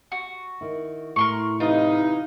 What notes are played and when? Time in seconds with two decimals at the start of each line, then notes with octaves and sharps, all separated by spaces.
0.12 F#4
0.61 D#3 E4
1.16 A2 A#4 C6 C#6
1.60 C3 E3 D#4 F4